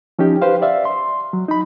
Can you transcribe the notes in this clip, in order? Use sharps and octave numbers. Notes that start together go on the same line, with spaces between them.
F3 C#4 D#4 G4
G4 B4 C5 F5
D5 E5 F5
C6
F#3
D#4 B5